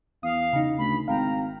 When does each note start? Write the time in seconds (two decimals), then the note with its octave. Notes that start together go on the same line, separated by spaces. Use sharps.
0.23 E2 F5 D#6
0.53 C#3 D#4
0.78 D2 B5
1.08 G#1 F5 G5 A#5 F6